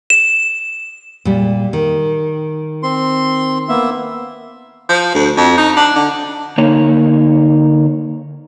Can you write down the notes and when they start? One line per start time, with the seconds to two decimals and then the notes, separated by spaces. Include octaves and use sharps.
0.10 E7
1.25 A#2 G3
1.73 D#3
2.83 C4 C6
3.69 A#3 B3 E5
4.89 F3
5.14 D2
5.37 F2
5.57 D#4
5.76 D4
5.95 D3
6.58 D3 A#3 D#4 A#4 C#5